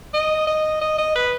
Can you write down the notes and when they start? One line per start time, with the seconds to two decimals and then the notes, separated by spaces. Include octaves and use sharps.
0.14 D#5
0.47 D#5
0.81 D#5
0.98 D#5
1.16 B4